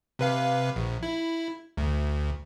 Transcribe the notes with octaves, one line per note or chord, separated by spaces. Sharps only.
C3 B4 F5
A#1
E4
D2